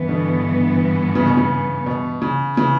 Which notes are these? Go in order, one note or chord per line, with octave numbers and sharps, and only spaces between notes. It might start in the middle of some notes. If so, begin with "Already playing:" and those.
Already playing: G2 E3 B3
B2 D3
C#3
B2
C#3
B2
C#3
C#3 E3